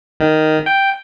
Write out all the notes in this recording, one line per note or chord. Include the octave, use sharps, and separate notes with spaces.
D#3
G5